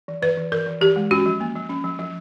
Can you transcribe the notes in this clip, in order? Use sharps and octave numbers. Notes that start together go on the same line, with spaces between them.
E3
E3 B4
E3
E3 A#4
E3
E3 G4
G#3
C#4 F#4
F3
A#3
F3
C#4
F3
F3